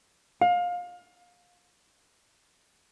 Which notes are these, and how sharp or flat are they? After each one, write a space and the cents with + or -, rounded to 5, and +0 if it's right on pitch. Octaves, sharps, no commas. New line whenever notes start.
F5 +25